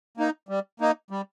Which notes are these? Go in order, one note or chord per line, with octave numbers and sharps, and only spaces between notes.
A#3 D#4
G3
A#3 D#4
G3